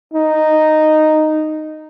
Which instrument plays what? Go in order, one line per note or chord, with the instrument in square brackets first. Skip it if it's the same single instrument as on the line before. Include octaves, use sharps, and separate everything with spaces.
[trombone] D#4